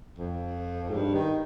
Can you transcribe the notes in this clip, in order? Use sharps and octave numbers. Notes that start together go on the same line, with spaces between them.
F2
G#2
G2
D#3